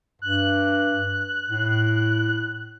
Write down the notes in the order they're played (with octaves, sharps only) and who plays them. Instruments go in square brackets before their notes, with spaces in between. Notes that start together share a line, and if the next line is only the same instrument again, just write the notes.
[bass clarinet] G2 [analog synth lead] F#6
[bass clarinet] A2